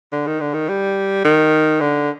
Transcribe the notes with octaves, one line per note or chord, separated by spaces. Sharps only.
D3
D#3
D3
D#3
G3
D#3
D3